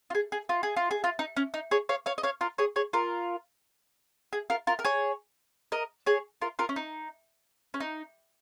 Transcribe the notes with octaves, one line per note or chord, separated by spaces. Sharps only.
F4
G#4
G#4
F4
G#4
F4
G#4
F4
D#4
C#4
D#4
G#4 C#5
C#5 F5
C#5 F5
D#5
C#5 F5
F4 A#4
G#4 C#5
G#4 C#5
F4 A#4
G#4
F4 A#4
F4 A#4
A#4
G#4 C#5
A#4 D#5
G#4 C#5
F4 A#4
F4 A#4
C#4
D#4
C#4
D#4